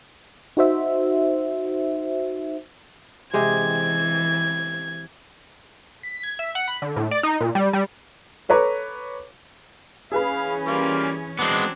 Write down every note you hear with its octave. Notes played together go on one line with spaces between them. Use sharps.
D#4 F#4 C5 E5
C3 E3 G#3 G4 G#6
B6
G#6
E5
F#5
B5
D3
A2
D5
D#4
A#2
G3
G3
A4 B4 C#5 A#5 D6
E3 C#4 G#4 B4 F5 B5
G3 A#3 F4
F#3 G#3 B3 C4 D4